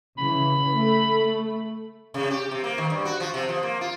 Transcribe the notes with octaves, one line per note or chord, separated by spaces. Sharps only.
C#3 E3 B5
A3
C3
G4
C3
A#3
D#3
G2
F#4
F3
C3
F3
A#3
F4